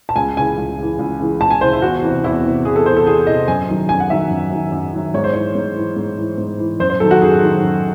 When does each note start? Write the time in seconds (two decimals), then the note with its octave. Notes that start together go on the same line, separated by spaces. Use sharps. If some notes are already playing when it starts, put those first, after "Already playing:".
0.09 A5
0.16 C#2 G#5
0.37 C#3 E3 G#5
0.58 C#2
0.78 C#3 E3
0.99 C#2
1.20 C#3 E3
1.41 C#2 A5
1.51 G#5
1.61 C#3 E3 C5
1.73 E4
1.82 E2 F#4
2.03 C3 E3
2.24 E2 E4
2.44 C3 E3
2.65 E2 G#4
2.76 A4
2.85 C3 E3 C5
2.97 A4
3.07 E2 G#4
3.27 C3 E3 D#5
3.48 F#2 G#5
3.69 D#3 F#3
3.89 F#2 G#5
4.00 F#5
4.10 D#3 F#3 E5
4.31 F#2
4.52 D#3 F#3
4.72 F#2
4.93 D#3 F#3
5.14 G#2 C#5
5.24 C5
5.33 E3 C#5
5.55 G#2
5.76 E3
5.96 G#2
6.18 E3
6.38 G#2
6.59 E3
6.80 F#2 C5
6.90 C5
7.00 D#3 F#3 A4
7.11 F#4
7.21 F#2 G#4
7.42 D#3 F#3
7.63 F#2